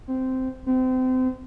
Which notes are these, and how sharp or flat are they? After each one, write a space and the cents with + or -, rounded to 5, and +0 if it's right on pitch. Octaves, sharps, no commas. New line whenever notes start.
C4 -10
C4 -30